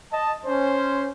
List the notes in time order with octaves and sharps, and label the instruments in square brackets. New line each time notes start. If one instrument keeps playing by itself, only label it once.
[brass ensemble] D#5 A5
C#4 C5